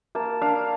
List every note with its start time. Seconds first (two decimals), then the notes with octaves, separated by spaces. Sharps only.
0.15 A#3 A5
0.42 D4 F5